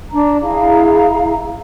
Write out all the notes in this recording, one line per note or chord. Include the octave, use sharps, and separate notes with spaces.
D4 A#5
E4 G#4 F5 A#5